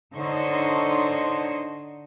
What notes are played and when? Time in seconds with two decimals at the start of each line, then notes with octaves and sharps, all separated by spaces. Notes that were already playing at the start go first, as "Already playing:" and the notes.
0.14 D3 D4 D#4 C5 C#5 D#5